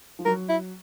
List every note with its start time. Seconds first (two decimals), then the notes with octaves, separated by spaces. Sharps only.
0.19 F3
0.25 F#3 A#4
0.49 E4